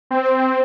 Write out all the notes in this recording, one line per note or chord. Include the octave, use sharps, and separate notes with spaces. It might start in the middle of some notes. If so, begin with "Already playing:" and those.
C4